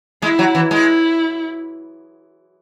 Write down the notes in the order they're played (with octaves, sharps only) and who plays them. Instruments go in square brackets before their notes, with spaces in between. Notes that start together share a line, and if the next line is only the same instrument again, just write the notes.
[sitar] G#3 [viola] E4
[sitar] F#3
E3
[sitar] G#3 [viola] E4